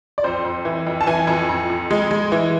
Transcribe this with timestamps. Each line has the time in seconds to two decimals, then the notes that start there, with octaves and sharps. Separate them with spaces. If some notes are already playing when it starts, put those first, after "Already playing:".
0.18 D5
0.24 F2 C5
0.45 F2
0.65 E3
0.87 F2
1.01 A5
1.07 E3 G#5
1.27 F2
1.49 F2
1.70 F2
1.91 G#3
2.11 G#3
2.32 E3